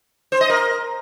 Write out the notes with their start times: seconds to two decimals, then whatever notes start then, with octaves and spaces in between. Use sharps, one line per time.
0.32 C5
0.41 D#5
0.50 A#4